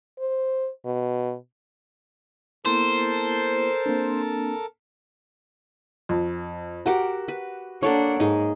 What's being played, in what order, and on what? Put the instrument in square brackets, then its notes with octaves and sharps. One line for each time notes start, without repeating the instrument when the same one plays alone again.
[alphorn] C5
B2
[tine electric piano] A#3 B3 E4 [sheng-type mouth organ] A4 A#4 A5 [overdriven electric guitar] C5
[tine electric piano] A#3 C4 D4
[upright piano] F2
[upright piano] F#4 [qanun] G4 A#4 F#5
[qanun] B4
[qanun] A#3 A4 C#5 [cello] D4 F#5
[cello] G#2 [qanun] D#4 G#4